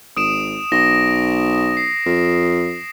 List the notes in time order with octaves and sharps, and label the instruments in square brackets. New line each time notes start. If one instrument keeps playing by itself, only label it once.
[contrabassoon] G#1 [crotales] D#6 D7 E7
[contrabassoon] B1 [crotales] A#6
[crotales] C7
[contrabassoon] F2